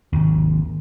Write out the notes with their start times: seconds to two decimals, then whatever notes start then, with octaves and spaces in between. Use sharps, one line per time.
0.13 G#1 D#2